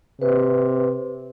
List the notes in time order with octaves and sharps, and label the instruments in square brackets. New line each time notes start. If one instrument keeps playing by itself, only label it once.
[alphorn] C3 [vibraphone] B4